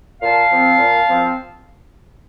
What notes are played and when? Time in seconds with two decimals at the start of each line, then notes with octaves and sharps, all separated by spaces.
0.22 A#2 F5 A5
0.51 F3 C4
0.79 A#2
1.07 F3 C4